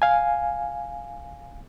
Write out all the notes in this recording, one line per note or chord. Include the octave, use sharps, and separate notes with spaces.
F5 G#5